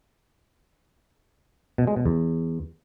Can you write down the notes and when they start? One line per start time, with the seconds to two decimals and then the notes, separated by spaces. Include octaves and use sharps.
1.78 B2
1.87 G#3
1.96 B2
2.06 E2